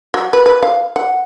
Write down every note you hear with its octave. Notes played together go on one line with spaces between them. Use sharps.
F#3
B4
B4
F5
F#5